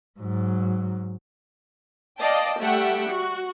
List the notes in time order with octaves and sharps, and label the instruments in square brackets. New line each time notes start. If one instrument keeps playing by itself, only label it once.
[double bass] G#2 F#3
[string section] D5 D#5 F5 G5 A5
G3 A3 E5 F#5 G5
F#4